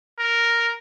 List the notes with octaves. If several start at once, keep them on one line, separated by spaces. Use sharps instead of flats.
A#4